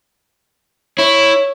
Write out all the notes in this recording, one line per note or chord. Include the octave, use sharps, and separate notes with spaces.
E4 C#5